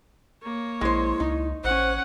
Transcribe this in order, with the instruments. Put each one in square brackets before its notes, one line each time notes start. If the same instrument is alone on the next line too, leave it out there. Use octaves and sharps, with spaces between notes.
[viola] A#3 C#5
[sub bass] A#1 [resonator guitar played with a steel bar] G#3 C5 [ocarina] E4
[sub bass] C#2 [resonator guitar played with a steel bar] D#4
[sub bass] A1 [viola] C#4 F#5 [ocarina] C5